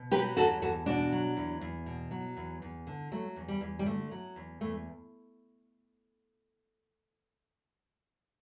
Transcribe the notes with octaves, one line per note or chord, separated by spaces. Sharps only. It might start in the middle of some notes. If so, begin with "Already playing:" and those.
Already playing: B2
F#3 G4 B4
E2 F#4 A4
E2 F#4 A4
B2 D4 F#4
F#3
E2
E2
B2
F#3
E2
E2
D3
F#3 A3
E2
G3
E2
G3
D3 A3
F#3
E2
E2 A3